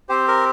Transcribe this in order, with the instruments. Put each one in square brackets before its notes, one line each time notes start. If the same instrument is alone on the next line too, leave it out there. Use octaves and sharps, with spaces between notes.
[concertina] C4 G4 C5
A#4